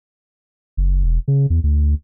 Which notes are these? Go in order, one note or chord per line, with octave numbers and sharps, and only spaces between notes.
F#1
E1
C#3
E2
D2